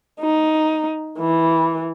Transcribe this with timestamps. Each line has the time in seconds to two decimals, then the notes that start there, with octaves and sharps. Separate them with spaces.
0.21 D#4
1.20 E3